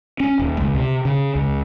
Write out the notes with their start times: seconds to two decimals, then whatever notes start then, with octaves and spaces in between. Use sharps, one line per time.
0.20 C#4
0.39 D#1
0.61 C#2
0.75 C3
1.05 C#3
1.35 C#2